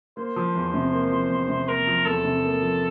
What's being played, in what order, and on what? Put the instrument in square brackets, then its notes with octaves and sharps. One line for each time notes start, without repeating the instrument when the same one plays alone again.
[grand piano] A#3 [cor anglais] C5
[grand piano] F3
E2
C3
A#3
F3
E2
C3
[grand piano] A#3 [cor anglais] A#4
[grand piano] F3
[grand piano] E2 [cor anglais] A4
[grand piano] C3
A#3
F3